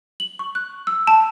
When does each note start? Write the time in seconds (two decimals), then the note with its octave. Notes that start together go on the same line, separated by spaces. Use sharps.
0.20 F#7
0.39 C#6
0.55 F#6
0.87 E6
1.07 A5